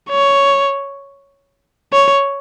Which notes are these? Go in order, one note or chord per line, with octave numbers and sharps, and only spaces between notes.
C#5
C#5